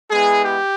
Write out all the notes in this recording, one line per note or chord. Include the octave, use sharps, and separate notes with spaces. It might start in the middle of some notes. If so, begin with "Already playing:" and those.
G#3 B3 E4 G#4
G4